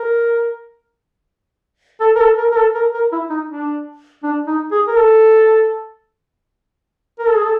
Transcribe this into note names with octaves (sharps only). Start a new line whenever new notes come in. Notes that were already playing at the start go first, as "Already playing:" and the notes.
Already playing: A#4
A4
A#4
A4
A#4
A#4
A4
A#4
A#4
E4
D#4
D4
D4
D#4
G#4
A#4
A4
A#4
A4
G#4
A4